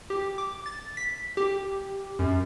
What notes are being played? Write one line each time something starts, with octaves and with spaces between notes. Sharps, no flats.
G4
D6
A6
B6
G4
F#2